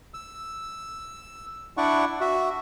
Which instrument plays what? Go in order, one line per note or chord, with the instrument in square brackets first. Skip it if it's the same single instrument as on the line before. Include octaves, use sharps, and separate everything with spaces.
[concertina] E6
D4 E4 D5 F#5 C#6
F#4 E5